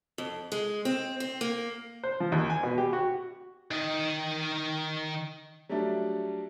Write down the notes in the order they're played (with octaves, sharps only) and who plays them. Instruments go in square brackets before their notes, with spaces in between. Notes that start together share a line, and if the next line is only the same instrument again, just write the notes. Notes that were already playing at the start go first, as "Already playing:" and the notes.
[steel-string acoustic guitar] F2
G#3
C4
C4
A#3
[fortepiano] C5
F3
D#2
G#5
B2
G4
F#4
[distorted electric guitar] D#3 D#5
[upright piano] F#3 G3 A3 D4